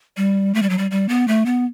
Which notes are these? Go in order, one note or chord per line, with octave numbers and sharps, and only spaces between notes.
G3
A3
G3
F#3
G3
G3
B3
A3
B3